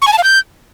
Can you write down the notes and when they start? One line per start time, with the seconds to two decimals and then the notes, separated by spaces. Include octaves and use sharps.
0.02 C#6
0.07 G#5
0.13 A5
0.18 F5
0.24 G6